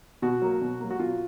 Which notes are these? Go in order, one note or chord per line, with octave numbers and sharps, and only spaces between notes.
B2 F#4
F#3 A#3
B2
F#3 A#3
F#4
B2 F4